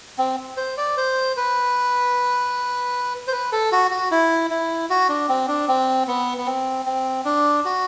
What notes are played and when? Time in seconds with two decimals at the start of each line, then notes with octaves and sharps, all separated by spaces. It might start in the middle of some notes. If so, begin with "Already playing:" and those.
0.18 C4
0.57 C5
0.77 D5
0.97 C5
1.37 B4
3.28 C5
3.33 B4
3.52 A4
3.72 F#4
3.91 F#4
4.11 E4
4.50 E4
4.90 F#4
5.09 D4
5.29 C4
5.48 D4
5.68 C4
6.07 B3
6.38 B3
6.46 C4
6.86 C4
7.25 D4
7.65 F#4